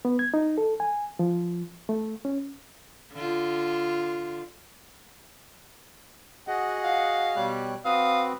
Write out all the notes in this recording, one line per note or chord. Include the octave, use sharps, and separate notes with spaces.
B3
G#6
D#4
A4
G#5
F3
A3
C#4
D3 F4
F#4 G#4 D#5 F#5
F5
B2 G3 C#5 F#6
C4 F#4 B4 F5 D#6